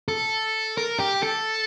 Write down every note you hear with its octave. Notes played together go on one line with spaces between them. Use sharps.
A4
A#4
G4
A4